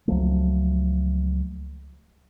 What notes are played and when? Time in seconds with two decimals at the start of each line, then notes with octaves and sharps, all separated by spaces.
0.08 C#2 F3 F#3 A3